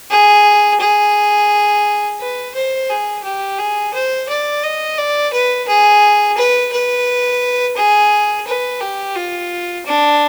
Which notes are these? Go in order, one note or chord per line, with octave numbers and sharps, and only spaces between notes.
G#4
G#4
B4
C5
G#4
G4
G#4
C5
D5
D#5
D5
B4
G#4
B4
B4
G#4
B4
G4
F4
D4